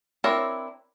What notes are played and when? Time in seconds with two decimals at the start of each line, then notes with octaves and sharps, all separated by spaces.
0.24 C4 D4 E4 A#4 C#5